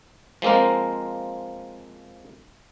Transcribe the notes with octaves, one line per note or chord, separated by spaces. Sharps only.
F3 G#3 A#3 C4 A#4